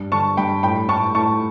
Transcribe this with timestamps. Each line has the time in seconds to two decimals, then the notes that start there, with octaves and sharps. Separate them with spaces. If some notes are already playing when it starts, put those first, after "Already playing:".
Already playing: G2
0.12 D3 A5 C#6
0.37 G2 G5 B5
0.63 A2 G5 B5
0.89 A2 A5 C#6
1.15 A2 A5 C#6